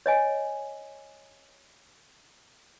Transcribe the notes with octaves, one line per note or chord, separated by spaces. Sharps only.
C#5 D#5 G#5